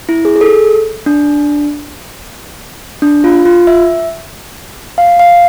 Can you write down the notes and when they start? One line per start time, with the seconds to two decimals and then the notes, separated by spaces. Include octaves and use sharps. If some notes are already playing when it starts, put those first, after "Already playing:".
0.09 E4
0.25 G#4
0.36 G#4
0.41 A4
1.06 D4
3.02 D4
3.24 F4
3.45 F4
3.67 E5
4.98 F5
5.19 F5